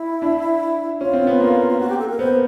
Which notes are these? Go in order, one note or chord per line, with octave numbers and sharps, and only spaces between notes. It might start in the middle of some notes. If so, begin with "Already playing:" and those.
Already playing: E4
D4
C#4 F4
C4
B3
A#3
F4
F#4
G4
A4
A#4
B3 C5